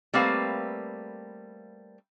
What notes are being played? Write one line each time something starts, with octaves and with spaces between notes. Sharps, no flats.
G3 A3 A#3 C4 B4 F5